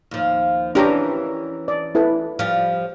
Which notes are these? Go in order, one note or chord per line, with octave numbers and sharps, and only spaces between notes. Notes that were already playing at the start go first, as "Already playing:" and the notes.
D#2 F3
E3 C#4 D4 G4 A#4 A#5
D5
E4 A4 B4
F3 G3